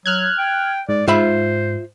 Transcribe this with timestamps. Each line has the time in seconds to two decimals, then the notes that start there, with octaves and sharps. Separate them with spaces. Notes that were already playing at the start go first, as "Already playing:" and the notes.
0.06 F#3 F6 F#6 G#6
0.39 G5
0.89 G#2 D5
1.08 G#2 F4 C5 E5 B5